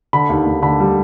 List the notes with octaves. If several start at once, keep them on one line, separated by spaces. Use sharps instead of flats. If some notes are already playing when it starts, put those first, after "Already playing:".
D3 B5
D#2
D#2
D3 B5
G3